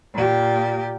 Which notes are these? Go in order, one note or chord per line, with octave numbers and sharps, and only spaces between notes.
A#2 G4